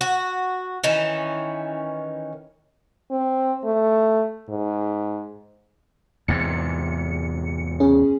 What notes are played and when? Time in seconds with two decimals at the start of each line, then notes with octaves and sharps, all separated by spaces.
0.01 F#4
0.84 D#3 E3 C#4
3.11 C4
3.64 A3
4.49 G#2
6.28 E2 G#2 C3 C#7
7.80 C#4 G#4